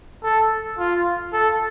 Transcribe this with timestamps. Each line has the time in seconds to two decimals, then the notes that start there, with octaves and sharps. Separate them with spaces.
0.24 A4
0.79 F4
1.33 A4